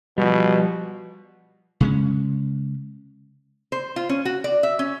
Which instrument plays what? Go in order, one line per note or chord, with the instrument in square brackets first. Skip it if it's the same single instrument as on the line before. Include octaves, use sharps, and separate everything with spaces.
[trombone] B2 [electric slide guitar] F3 G3
[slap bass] C#3 G#3 C#4
[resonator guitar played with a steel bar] C5
F4
C#4
F#4
D5
E5
C#4